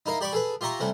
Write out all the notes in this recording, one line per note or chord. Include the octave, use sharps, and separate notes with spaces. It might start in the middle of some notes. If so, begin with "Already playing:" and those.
D#4 E4 A#4 F5
G4 D5 B5 C#6 D6
G#4 A4 B4
F4 G4 E5 A#5 C#6
C3 G3 A3 C#4